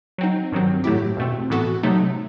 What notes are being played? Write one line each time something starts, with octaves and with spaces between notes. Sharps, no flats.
F#3 C4 D#4
G2 D#3 F#3 C4
A2 F#3 A3 E4 G4
E2 B2 A3 C4
A2 E3 B3 F#4 A4
C3 F#3 A3 D#4